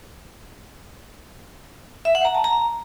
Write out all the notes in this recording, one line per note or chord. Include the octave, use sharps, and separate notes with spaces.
E5
F#5
A#5
A5
A#5